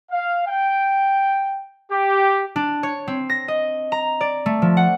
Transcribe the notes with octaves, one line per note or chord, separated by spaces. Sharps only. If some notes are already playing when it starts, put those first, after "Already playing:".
F5
G5
G4
D4
C#5
C4
A#6
D#5
A#5
D5
A3
F3
F#5